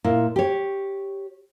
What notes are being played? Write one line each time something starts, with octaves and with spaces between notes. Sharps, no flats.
A#2 E4
G4 C#5